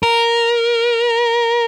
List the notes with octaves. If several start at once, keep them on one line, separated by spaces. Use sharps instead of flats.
A#4